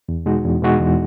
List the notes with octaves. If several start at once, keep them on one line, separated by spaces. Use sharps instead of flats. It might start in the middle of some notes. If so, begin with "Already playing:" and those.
E2
B2 G#3 D#4 F#4
E2
B2 G#3 D#4 F#4
E2